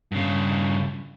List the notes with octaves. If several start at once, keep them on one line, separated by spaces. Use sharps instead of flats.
G2 C#3